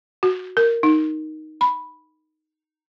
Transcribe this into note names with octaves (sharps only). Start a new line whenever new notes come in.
F#4
A#4
D#4
B5